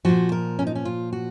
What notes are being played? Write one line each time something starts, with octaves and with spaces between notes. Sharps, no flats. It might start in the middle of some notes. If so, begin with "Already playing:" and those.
A#2 F3 F#4
A#4
C#4
D#4
C#4
F4
F#4